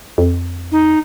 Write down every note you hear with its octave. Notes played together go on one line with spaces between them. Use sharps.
F2
D#4